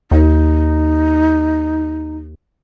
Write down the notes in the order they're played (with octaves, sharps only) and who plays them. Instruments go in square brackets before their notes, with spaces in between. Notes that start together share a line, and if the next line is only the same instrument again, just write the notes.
[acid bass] D#2 [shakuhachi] D#4